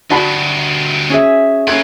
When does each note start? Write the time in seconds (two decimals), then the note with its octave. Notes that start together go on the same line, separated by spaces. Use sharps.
0.10 D2 G3 F#4 D5 A5 B5
1.09 C#4 G#4 E5
1.67 A#3 C#4 A4 B4 G#6